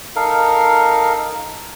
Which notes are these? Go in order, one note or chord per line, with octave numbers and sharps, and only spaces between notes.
D#4 A4 A#4 F5